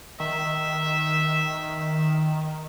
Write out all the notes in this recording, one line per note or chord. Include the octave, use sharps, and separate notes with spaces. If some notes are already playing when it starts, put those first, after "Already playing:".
D#3 E5